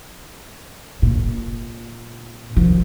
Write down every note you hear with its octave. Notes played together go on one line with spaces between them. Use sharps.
A#2
D#3 F3